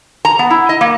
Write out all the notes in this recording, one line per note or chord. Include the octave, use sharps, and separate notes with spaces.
A#5
B3
E4
D#5
A#3